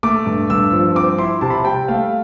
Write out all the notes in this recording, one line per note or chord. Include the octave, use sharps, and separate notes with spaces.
A3 D6
G2
G2 E6
F3
C4 D6
E4 C6
C3 A5
B5
A5
G3 G5
A3 F5